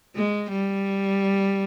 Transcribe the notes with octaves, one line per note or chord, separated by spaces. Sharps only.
G#3
G3